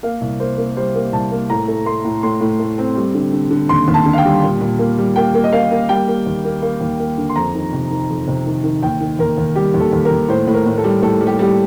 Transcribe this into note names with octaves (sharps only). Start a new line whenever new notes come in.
A#3 F5
C2
A#3 C5
A#3
G3 C5
A#3
C2 A5
A#3
A2 A#5
A3
A3 C6
A2
A2 C6
A2
A3
C4
G3
D3
D3
D3
D#2 C6
D#2
A5
D3
F5
G5
G3
A#2
A#2
A#3
G3
A#3 G5
A#3
D#5
A#3 F5
A#3
G3 G5
A#3
D#2
A#3
A#3
D#2
A#3
D3
C6
F2 A#5
D#3
C3
D#3
F2
C3
D#3
D#3
D#2 G5
D#3
D#2 A#4
D#2
G3 G4
D#2
A4
D#2
A#4
D#2
A2 C5
A2
A#4
A2
A4
G3
A2 A4
G3
G4
G3 G4